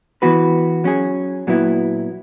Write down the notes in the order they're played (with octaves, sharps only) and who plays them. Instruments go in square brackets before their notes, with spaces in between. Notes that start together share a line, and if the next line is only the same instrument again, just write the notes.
[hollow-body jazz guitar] E3 B3 F#4 B4
F#3 C#4 G#4
A#2 F#3 B3 E4